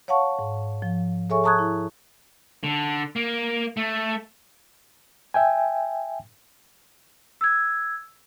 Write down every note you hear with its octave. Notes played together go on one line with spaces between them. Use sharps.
C#5 F5 F#5 A5 C#6
G#2
F3
G#4 A4 C#5 E5 G#5 C#6
A5 A#5 C#6 D#6 F#6 G#6
E4
D3
A#3
A3
E5 G5 G#5
E6 G#6